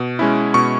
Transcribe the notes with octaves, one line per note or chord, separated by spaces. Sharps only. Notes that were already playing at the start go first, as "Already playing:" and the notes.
Already playing: B2
G#3 C#4 E4
B2 C#6